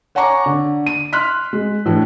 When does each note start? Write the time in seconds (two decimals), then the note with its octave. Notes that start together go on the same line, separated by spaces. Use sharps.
0.15 C#5 F#5 G#5 A#5 C#6 D6
0.46 D3
0.86 D#7
1.13 C6 F6 F#6 B6
1.53 G#3
1.85 A2 E3 D4